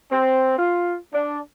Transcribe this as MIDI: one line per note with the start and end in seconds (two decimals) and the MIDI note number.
0.10 0.54 60
0.58 0.96 65
1.13 1.37 62